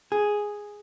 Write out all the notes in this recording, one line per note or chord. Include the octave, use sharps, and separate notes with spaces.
G#4